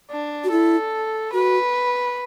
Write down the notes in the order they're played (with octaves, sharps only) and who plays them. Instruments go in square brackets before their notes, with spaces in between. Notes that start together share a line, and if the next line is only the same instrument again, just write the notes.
[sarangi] D4
[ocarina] F#4
[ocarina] E4 [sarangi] A4
[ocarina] F#4 [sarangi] B4